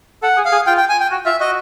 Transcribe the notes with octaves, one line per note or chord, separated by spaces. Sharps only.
A4 F#5
G#4
F5
G#4
F4 G5
G5
G#5
G5
F#4
F4 E5
F#4 D#5